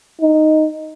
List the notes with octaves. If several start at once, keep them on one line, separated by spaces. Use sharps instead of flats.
D#4